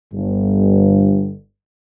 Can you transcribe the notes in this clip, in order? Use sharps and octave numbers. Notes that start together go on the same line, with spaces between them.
G1 G2